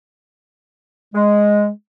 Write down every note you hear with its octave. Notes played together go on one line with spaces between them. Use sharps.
G#3